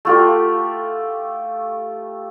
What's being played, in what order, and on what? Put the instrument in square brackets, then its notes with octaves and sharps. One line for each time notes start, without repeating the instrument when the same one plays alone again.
[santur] A3 F4 G4